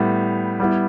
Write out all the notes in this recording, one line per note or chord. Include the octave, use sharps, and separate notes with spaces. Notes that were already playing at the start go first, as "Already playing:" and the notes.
Already playing: A2 G3 B3
G3 B3 E4